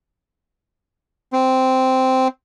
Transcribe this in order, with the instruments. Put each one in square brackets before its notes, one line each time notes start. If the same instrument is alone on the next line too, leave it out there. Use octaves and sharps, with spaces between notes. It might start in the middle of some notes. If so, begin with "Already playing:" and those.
[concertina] C4